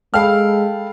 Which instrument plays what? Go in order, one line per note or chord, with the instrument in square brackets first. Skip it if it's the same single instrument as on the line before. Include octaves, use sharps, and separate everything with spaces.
[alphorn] G#3 [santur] A4 G5 B5 [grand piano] F5 F6